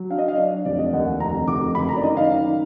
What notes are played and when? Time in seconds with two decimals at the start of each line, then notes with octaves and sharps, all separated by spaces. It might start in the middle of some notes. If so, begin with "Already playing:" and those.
Already playing: F#3
0.10 D4 F5
0.18 D#5
0.28 F5
0.37 D4 D5
0.65 F1 D5
0.79 D#5
0.93 D#2 F#5
1.20 F1 A#5
1.48 F1 D6
1.75 F#1 B5
1.89 A#5
1.96 D5
2.03 D#3 D#5
2.17 F5
2.31 D#3